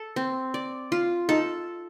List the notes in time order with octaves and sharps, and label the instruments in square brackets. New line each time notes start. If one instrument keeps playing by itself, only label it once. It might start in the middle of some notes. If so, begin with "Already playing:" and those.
Already playing: [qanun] A4
C4
D5
F4
[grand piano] D#4 [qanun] A4